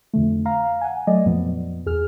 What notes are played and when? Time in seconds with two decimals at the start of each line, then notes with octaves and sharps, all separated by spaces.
0.13 F2 D3 A3
0.46 F5 A#5
0.81 F#5 G#5
1.07 F#3 A3 D5 D#5
1.25 F2 A#2 F3 B3
1.86 E2 G#4 F6